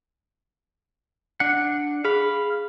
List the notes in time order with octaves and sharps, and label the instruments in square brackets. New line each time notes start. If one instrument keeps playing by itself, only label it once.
[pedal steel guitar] D4 F#5 [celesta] C#7
[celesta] G#4 [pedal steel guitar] F5 B5